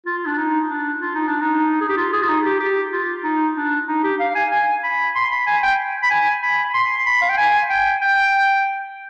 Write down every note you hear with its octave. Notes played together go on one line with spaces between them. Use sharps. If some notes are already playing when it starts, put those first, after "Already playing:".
F4
D4
D#4
D4
F4
D#4
D4
D#4
G#4
G4
F4
G#4
F4
D#4
G4
G4
F4
D#4
D4
D#4
G4
F5
G#5
G#5
B5
C6
B5
G#5
G5
B5
G#5
B5
B5
C6
B5
F5
G5
G#5
G5
G5